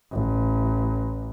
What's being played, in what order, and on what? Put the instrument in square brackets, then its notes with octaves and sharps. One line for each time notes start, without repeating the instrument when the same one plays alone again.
[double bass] A1